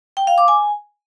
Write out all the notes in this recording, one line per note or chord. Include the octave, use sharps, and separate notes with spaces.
G5
F5
D6
G#5